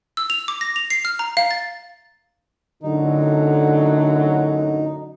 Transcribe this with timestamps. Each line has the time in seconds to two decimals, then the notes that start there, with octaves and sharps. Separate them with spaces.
0.17 E6
0.30 F7
0.48 D6
0.61 A#6
0.76 F7
0.90 C7
1.05 F6
1.19 A#5
1.37 F5
1.51 A6
2.83 F#2 A2 D3 F#3 D#4